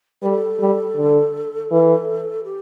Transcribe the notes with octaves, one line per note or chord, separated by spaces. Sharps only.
G3 A4 B4
G3
D3
E3
G4